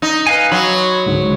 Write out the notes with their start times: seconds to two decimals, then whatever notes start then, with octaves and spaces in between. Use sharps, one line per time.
0.02 D#4
0.27 B4 F5 G#5
0.52 F#3 B5 C6
1.06 C#2 G#2 D3